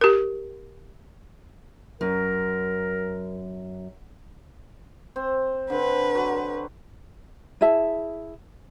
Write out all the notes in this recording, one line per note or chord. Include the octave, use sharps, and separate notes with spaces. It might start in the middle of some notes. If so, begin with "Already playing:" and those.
G4 A#4
F#2 A#4
C4
D3 C4 B4
F#3
E4 G#4 E5 A5